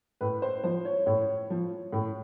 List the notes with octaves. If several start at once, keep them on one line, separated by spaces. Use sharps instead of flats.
A2 B4
C5
F3 C5
C#5
A2 C#5
F3
A2